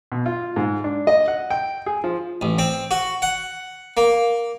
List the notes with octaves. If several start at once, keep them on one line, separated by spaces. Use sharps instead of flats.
B2
F4
G#2
D4
D#5
F#5
G5
G#4
F3
A1
C4
F#4
F#5
A#3